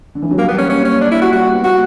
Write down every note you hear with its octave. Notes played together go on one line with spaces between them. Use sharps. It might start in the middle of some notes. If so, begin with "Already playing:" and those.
D3
E3
F#3
G3 A#3
B3
C#4
A#3 C#4
C#4
D4
E4
F#4
G3 F#4
B3
A#3 F#4